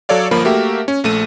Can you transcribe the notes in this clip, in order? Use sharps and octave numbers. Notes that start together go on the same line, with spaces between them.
F#3 A4 C#5 D5 F5
G1 F3 A#3 B5
A3 A#3 F#4 G4 E5
C#4
A#1 A3 D#7